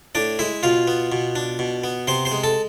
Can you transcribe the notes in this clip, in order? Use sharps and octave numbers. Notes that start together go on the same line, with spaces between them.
A2 D4 D5
G#3 E4 E5
B2 F4 F5
B3
B2
D4
B2
B3
C3 C5 C6
C5 C6
G#3
A4 A5